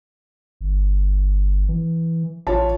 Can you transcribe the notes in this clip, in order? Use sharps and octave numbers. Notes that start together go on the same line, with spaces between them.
G1
E3
A1 F4 C#5 A5